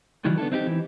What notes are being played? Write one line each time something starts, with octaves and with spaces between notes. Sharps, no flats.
C#2 D#3 E3 F#3 G3
B3 D4 E4 A4
C4 D#4 E4 G4
E3